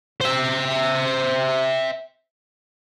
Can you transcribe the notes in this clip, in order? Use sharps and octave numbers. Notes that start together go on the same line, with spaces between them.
C5 E5